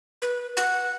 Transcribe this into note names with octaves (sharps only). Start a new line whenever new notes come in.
B4
F#5